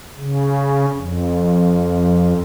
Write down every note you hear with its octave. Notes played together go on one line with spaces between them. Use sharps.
C#3
F2